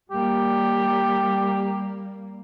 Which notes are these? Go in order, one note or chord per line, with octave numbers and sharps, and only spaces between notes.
G3 A#3 G4